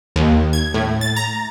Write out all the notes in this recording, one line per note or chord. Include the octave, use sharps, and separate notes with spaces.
D#2
G#6
A2
A6
A#5